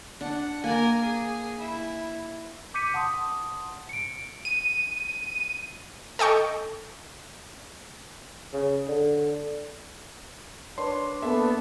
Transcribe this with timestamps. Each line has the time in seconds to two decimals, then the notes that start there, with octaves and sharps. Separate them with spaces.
0.21 D4 F#5
0.64 A#3 A#4 D5 G#5
1.04 G#4
1.60 E4
2.74 D6 G6 B6 C#7 D#7
2.94 F#5 A5 C6 D#6
3.89 C#7 D7
4.45 D#7
6.19 A4 D#5 G5 C#6
8.53 C#3
8.88 D3
10.78 D4 B4 C#5 C6
11.22 A#3 B3 A4 E5 A5